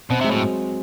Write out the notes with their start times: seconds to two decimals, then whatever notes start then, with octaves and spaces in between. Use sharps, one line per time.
0.10 B2 C4
0.20 C3 G#3
0.31 A2 F#3